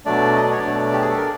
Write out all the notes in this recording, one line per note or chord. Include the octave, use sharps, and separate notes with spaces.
B2 F#3 A3 D4 D5
D#5
D5
C#5
D4 D5
B2 F#3 A3
G4
G#4
A4
A#4